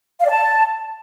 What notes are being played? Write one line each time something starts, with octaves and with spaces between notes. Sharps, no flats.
F5
D5
A5